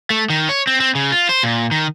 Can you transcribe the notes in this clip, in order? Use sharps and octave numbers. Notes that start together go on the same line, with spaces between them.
A3
D#3
C#5
C4
C4
C#3
F4
C5
A#2
D#3